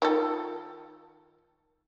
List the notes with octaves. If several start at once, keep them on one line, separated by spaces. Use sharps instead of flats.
D#3 F4 A4